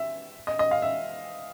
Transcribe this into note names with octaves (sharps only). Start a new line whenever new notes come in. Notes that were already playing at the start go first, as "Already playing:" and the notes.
Already playing: E5
D#5
D#5
F5
E5